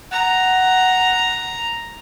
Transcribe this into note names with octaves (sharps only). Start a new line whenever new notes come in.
F#5 A#5